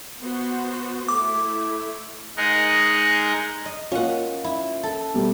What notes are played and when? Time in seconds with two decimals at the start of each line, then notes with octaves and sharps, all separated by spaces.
0.22 B3 F#4 C5
1.08 A3 E4 D6
2.37 G#3 D#4 G#4 A#4 D#5 F#5
3.66 D#5
3.92 A#3 C#4 F4 F#5
4.44 E4
4.83 A4
5.14 B2 G3 A3